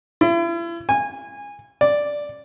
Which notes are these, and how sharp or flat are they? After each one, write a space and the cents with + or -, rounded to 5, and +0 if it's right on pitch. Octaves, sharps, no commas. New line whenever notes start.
E4 +40
G#5 -20
D5 +0